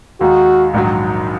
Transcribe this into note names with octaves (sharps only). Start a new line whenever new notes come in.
D#2 D#3 G#3 D#4 F#4
A#1 G#2 D#3 F#3